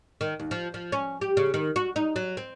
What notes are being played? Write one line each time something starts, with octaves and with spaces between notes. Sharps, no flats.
D#3
D#2
F3
F3
C#4
G4
C#3
D#3
F#4
D#4
F#3
C4